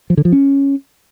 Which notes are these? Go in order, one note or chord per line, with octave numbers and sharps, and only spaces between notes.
F3
D3
F3
C#4